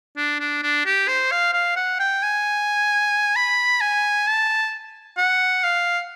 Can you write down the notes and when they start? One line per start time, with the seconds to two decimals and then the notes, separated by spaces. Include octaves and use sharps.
0.17 D4
0.40 D4
0.63 D4
0.86 G4
1.08 C5
1.31 F5
1.53 F5
1.76 F#5
1.99 G5
2.22 G#5
3.36 B5
3.81 G#5
4.27 A5
5.17 F#5
5.64 F5